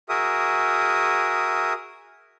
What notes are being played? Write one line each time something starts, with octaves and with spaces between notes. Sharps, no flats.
F#4 G#4 A#4 E5 D#6